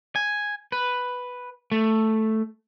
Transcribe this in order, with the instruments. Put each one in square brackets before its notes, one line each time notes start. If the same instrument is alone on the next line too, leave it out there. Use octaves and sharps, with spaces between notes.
[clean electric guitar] G#5
B4
A3